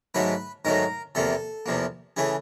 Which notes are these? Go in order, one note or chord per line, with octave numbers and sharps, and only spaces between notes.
G#2 D#3 F#3 A3 B4
G#2 D#3 F#3 A3 A#4
E2 C3 F3 A#3 A4
E2 C3 F3 A#3
C#3 E3 A3 G#4